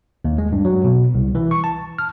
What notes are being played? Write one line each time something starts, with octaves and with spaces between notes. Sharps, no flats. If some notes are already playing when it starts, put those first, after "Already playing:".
D#2
G#3
G2
F#3
B2
C2
E3
C#6
A5
F6